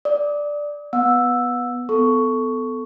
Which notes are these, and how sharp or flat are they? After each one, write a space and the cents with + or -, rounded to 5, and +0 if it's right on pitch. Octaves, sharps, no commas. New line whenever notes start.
D5 +0 D#6 +35
B3 +0 F#5 -40 E6 +0
B3 +25 A4 +0 C#6 +10